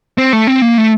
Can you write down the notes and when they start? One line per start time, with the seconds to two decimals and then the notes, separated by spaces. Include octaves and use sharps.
0.18 C4
0.33 A3
0.47 C4
0.62 A#3
0.78 A3